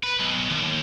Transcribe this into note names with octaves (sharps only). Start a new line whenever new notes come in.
B4
B1
D#2